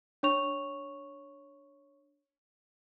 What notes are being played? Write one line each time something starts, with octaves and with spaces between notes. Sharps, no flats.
D4 C#5 C#6 F7